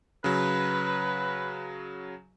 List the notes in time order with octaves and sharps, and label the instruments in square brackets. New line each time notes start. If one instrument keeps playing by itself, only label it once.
[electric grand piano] C#3 F#3 [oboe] B4